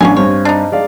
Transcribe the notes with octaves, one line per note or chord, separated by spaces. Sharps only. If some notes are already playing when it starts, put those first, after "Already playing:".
A1 F#3 C#4 D4 F5 G#5
G2 C4 C#5
D4 D#4
G#3 D5 F5